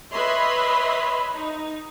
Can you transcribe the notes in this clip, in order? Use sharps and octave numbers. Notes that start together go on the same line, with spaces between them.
B4 C#5 D#5 E5 B5 C6
D#4